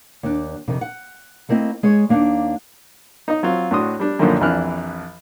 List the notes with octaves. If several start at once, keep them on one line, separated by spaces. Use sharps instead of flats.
D#2 D4
F2 C3 D#3
F#5
A3 A#3 C4 E4 D#5
G#3 G#4 C#5
D#2 A#3 D4 D#4
D#4 D#5
F#3 C4 F4
A2 D4 F#4 C6 D#6
G3 D4
F#2 A#2 D3 D#3 F3
A#1 F2 E3 D4 F6 F#6